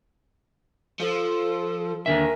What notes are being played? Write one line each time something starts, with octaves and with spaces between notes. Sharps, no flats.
F3 A4
D#2 D3 A#4 E5 G#5